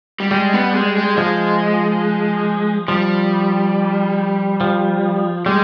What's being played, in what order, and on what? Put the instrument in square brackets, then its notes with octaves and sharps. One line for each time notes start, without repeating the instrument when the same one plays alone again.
[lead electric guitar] G3
[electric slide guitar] G3 [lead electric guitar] G#3
[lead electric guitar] B3
G#3
G#3
[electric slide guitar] F3 [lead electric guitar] G#3
[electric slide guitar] F3 [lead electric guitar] G3
[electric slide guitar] F3
[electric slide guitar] G3 [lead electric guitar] G#3